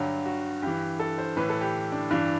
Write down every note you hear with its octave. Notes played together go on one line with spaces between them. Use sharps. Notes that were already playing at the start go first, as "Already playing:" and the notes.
Already playing: G2 D3 F#3 G4
F#4
G2 E3 G4
A4
C5
A2 E3 B4
A4
G4
D4
G2 E3 D4